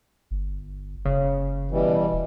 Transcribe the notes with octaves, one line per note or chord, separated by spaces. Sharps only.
G1
F#1 C#3
B2 E3 G3
D#1